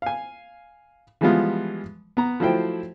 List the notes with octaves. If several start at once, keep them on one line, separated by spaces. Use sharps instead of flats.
F5 G#5
E3 F3 G3 G#3 B3 F4
B3 A#5
F3 F#3 A3 E4 C5 G5